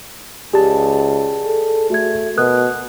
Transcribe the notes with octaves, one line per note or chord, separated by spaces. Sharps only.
C#2 G4 G#4 D5 A5
A4
A3 F#4 G#6
B2 A#4 D#6 F#6